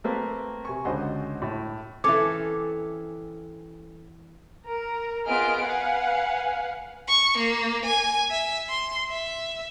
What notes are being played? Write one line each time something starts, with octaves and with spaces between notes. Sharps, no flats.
A3 A#3 C4 B4
C3 G#5 C#6
C#2 D3 F#4 C5 D#5
A2
E3 C4 C#4 A4 C#5 D6
A#4
B3 F4 G#4 D#5 F6 D7
B4 F5 F#5 G#5
C#6
A#3
G#5
E5
C6
E5